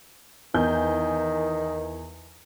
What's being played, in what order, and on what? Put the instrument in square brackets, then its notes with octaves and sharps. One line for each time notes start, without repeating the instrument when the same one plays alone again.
[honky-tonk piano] E2 G#5 G6 [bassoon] D#3